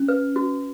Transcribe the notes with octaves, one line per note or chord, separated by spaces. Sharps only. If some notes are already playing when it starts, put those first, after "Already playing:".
Already playing: C#4
B4
F#4